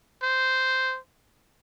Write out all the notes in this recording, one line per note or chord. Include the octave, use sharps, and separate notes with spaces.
C5